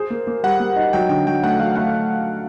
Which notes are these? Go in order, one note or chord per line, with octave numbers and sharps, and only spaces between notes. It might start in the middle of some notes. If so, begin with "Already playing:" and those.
Already playing: G#4 C5
A#3
A#3
G3 F#5
A#3
D#4
F#3 G5
D3 G5
F#3 G5
A3 F#5
F#3 F5
A3 F#5